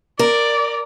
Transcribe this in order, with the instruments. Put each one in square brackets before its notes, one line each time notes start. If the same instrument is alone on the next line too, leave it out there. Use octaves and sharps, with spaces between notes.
[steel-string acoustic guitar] A#4 [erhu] D5